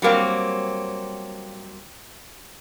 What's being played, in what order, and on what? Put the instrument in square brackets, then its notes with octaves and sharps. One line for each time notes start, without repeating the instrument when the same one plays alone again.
[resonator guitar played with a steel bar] F#3 G3 A#3 C4